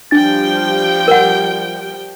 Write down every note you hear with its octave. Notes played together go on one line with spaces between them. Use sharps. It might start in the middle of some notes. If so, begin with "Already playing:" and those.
F3 G3 D4 G5 A6
A#4 F#5